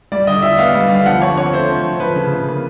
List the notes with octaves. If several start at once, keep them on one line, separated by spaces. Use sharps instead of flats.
G3 D5
D3 D#5
E4 E5
B3 F5
G3
D3
F5
F3 F#5
D3 C#5
C4 C#5
A3 C5
F3
D3
F3 B4
C#3
C#3
A#3